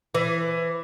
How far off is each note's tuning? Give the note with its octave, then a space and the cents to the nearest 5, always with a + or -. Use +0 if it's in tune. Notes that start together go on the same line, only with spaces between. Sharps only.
E3 +15